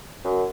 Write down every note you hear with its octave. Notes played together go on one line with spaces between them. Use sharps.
F#2